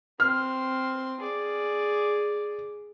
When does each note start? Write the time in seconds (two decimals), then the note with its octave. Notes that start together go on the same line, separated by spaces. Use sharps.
0.20 C4 C6 F6
1.20 G#4 D5